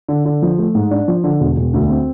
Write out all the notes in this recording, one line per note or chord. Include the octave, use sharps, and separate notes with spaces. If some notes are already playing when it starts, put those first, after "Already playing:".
D3
D3
F3
A3
G#2
D4
F3
D3
E1
E1
D2
C4